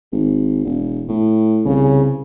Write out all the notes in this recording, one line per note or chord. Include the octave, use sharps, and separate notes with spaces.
G#1
E1
A2
C2 C#3